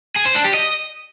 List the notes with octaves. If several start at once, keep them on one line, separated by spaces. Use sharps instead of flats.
G#4
C5
D4
G4
D#5